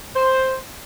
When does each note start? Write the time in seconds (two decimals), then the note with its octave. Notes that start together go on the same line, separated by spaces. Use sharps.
0.15 C5